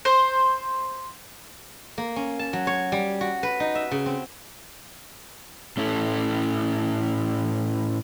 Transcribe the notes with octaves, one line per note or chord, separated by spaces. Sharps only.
C5
A#3
C#4
A5
F#3
C#5
G3
F#4
B4
D#4
E5
C#3
C4
A2 C#4 E4 A4 E5